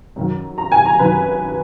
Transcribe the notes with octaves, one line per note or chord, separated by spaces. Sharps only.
F#2 D#3 F#3
A#5
G#5
A#5
F#2 D#3 F#3 B4